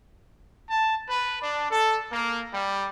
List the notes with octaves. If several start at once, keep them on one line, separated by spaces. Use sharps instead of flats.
A5
B4
D4
A4
A#3
G3